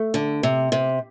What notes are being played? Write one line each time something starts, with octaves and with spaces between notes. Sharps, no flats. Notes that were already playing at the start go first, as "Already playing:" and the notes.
Already playing: A3
D3
C3
C3